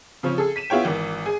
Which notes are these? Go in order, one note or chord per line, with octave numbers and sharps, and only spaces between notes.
C#3 F3 C4 C#4
G#4 A4
B6 D#7 E7
B3 E4 F4 C#5 G5
G#1 E3
G#4 G#5